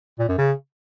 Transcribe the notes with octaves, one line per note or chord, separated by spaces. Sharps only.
A#2
F#2
C#3